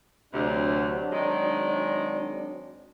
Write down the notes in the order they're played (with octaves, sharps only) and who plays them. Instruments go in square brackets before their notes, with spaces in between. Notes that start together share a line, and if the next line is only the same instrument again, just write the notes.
[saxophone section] D2 C3 [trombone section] F#3 C4 D4
[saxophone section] D#3 G#3